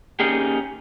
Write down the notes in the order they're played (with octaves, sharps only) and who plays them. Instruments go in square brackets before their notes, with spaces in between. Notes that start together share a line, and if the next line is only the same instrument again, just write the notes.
[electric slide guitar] A#3 C#4 D#4 G4 G#4